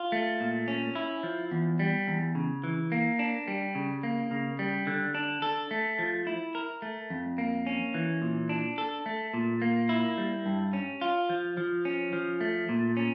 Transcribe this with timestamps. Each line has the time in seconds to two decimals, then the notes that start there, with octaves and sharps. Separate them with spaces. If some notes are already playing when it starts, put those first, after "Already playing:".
Already playing: F4
0.12 A3
0.40 A#2
0.68 C#4
0.95 E4
1.23 F3
1.51 E2
1.79 G3
2.08 E2
2.35 C#3
2.64 E3
2.92 A#3
3.19 D4
3.48 G3
3.75 C#3
4.03 A#3
4.31 C#3
4.59 G3
4.87 D3
5.15 D4
5.42 A4
5.71 A3
5.99 F3
6.27 E4
6.55 A#4
6.82 A3
7.10 F2
7.38 A#3
7.67 C#4
7.94 E3
8.22 A#2
8.49 D4
8.78 A4
9.06 A3
9.34 A#2
9.62 A#3
9.89 E4
10.18 G3
10.46 G2
10.73 C#4
11.01 F4
11.29 F3
11.57 F3
11.85 C#4
12.13 F3
12.41 A3
12.69 A#2
12.97 C#4